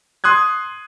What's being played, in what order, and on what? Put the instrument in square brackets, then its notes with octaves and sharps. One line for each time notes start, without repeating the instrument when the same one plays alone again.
[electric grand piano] C6 D#6 F#6 G#6